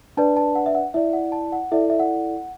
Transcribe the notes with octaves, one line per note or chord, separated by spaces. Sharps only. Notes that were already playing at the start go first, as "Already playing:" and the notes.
D4 B4 D5 A5
A5
F#5
E5
F#5
E4 D5 E5
F#5
A5
F#5
E4 A4 D5 E5
E5
F#5